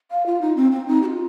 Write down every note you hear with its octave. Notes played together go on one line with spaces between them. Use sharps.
F5
F4
D#4
C4
C4
D#4
G4
F4